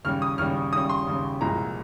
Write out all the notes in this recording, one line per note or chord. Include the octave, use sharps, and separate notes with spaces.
D#2 C#3 G3 F6
D#6
D#2 C#3 G3 F6
D#2 C#3 G3 D#6
C6
D#2 C#3 G3
C2 A#2 F3 G#3 A#5